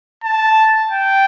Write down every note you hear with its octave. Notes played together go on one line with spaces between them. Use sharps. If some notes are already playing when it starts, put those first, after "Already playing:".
A5
G5